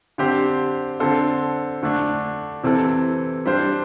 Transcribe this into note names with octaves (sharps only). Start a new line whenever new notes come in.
D3 C4 G4 C5
D3 C4 A4 C5
D3 A3 D4
C3 E3 C4 A4
G3 D4 C5